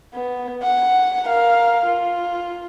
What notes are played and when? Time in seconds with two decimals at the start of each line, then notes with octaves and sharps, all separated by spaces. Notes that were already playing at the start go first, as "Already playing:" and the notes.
0.14 B3
0.63 F#5
1.26 A#4 F5
1.86 F4